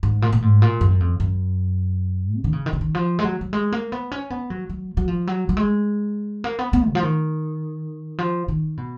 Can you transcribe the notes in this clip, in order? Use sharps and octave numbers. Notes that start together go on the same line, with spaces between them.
G#2
A#2
A#2
G#2
A#2
F#2
F2
F#2
C#3
D#3
C#3
D#3
C#3
D#3
F3
G#3
F#3
F#3
G#3
A#3
B3
C#4
B3
F#3
F#3
F#3
F3
F#3
F#3
G#3
A#3
B3
B3
C#3
F3
D#3
F3
D#3
B2